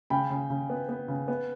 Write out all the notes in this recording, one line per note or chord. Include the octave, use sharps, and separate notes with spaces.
C#3 G5 B5
C#3
C#3
B3
B3
C#3
B3